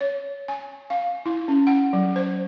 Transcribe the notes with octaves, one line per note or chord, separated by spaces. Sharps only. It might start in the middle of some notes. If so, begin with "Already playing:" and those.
C#5
G#5
F5
E4
C#4
F#5
F#3
C5